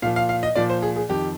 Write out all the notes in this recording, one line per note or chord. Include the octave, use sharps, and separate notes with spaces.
A#2 F3 F5
F5
F5
D#5
A#2 F3 D5
C5
G#4
G#4
F2 D#3 G4